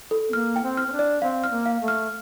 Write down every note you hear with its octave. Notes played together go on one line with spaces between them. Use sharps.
A4
C4
A#3 F6
G5
C4
F6
C4
D4
D5
C4 F5
F6
A#3
F5
A3
F6